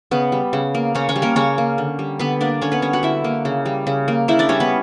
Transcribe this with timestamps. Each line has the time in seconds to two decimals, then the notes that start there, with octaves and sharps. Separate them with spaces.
0.11 C#3 B3 B4
0.32 G3
0.53 C#3
0.74 A#3
0.95 C#3 C#4 C#5
1.09 C#4 C#5
1.16 G3
1.22 A#3 A#4
1.36 C#3 C#4 C#5
1.58 A#3
1.78 D3
1.99 G3
2.19 D3 B3 B4
2.41 A#3 D4 D5
2.61 D3 C#4 C#5
2.72 B3 B4
2.82 G3 C#4 C#5
2.93 F#4 F#5
3.03 D3 E4 E5
3.24 A#3
3.45 C#3
3.66 G3
3.87 C#3
4.08 A#3
4.28 C#3 E4 E5
4.39 D4 D5
4.49 G3 C#4 C#5
4.60 B3 B4